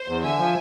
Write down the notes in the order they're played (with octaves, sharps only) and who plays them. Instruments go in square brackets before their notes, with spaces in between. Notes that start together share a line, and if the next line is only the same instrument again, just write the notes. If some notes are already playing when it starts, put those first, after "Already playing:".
Already playing: [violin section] C5
[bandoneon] E2
[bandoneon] D3 [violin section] E5 G#5
[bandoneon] F3